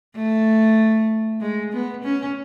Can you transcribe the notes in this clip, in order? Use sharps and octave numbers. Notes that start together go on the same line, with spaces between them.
A3
G#3
B3
C#4